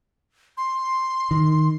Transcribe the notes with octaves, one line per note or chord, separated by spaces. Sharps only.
C6
D#3